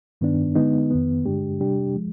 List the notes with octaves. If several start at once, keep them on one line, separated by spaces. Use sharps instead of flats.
G2 D#3 B3 D4
D3 G#3 B3 D#4
F2 D#3 B3
G2 D3 G#3 D4 G4
C3 G3 D4 G4
F3 G#3